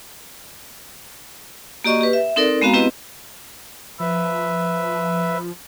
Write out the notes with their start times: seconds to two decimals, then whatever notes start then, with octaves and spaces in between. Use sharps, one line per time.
1.84 A#3 F#4 G4 D5 D#5 C#6
2.01 G4 B4
2.13 E5
2.36 C4 D#4 A4 A#4 D5
2.61 G#3 B3 C4 F#4 F5 A#5
2.73 B3 C4 E4 G4 B4 D#5
4.00 F3 B4 E5